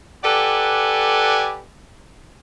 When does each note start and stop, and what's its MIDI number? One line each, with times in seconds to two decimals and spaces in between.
0.24 1.62 67
0.24 1.62 69
0.24 1.62 71
0.24 1.62 74
0.24 1.62 78
0.24 1.62 80